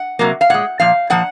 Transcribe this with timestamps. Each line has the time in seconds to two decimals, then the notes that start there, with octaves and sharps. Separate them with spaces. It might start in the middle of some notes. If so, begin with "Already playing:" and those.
Already playing: F#5
0.19 C3 F#3 A#3
0.41 F5
0.50 A#2 G#3 F#5
0.80 A#2 F3 F5
1.10 A#2 F3 A#3 F#5